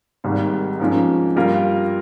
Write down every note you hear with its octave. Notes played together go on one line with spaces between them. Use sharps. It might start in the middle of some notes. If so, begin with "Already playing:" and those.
G#1 G#2 G3 A#3
G#2 F3 A#3 C#4
G2 G3 A#3 F4 A#4